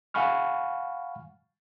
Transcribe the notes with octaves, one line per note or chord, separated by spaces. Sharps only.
F5 F#5 G#5 B5 C#6 F6